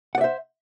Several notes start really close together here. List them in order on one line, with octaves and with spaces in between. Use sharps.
F#5 D5 E5 C5